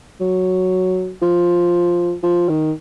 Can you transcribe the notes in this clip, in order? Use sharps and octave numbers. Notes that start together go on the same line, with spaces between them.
F#3
F3
F3
D#3